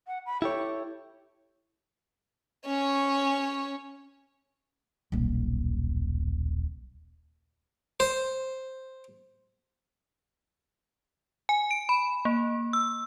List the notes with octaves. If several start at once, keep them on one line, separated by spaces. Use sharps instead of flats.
F#5
B5
E4 G4 A4 C#5
C#4 C#5
D#1 B1
C5
G#5
D7
B5
A#3
E6